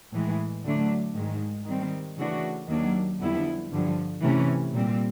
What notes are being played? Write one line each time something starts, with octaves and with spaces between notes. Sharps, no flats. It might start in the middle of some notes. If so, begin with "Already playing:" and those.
A2 E3 G#3
D2 D3 F#3 A3 D4
G#2 D#3 G#3
D#3 G3 C4
C#3 E3 A3 D4 F#4
D#2 D#3 F#3 A#3 D4
F2 D3 G3 B3 E4
G2 D3 F3
C3 E3 A3 C#4
A#2 G3 C4